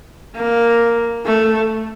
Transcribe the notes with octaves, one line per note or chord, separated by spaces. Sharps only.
A#3
A3